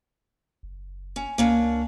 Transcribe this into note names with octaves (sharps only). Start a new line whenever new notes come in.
F#1
C#4
C#2 A#3 C#4 D4